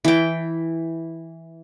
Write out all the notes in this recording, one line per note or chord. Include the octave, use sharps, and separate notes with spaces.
E3 G5